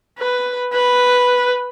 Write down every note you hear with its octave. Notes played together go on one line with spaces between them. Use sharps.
B4
B4